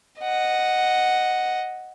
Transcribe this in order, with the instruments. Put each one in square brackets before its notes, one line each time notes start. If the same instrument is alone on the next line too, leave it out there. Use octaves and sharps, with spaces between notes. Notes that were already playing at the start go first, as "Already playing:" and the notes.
[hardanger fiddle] D#5 F#5